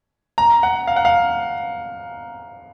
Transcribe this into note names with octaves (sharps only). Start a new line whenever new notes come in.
A#5
F#5
F5
F#5
F5